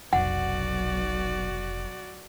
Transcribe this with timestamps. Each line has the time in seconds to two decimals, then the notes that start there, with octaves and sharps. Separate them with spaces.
0.13 F1 B1 F#4 D5 F#5